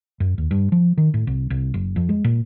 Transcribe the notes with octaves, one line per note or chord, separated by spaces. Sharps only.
F#2
D#2
G2
F3
D#3
A2
C2
C2
F#1
F2
G#3
A#2